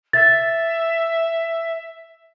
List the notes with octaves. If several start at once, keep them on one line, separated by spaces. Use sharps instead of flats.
E5 A6